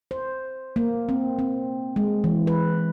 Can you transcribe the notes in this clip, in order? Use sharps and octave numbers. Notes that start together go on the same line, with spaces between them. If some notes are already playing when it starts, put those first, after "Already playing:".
C5
A#3
C4
C4
G#3
E3
B4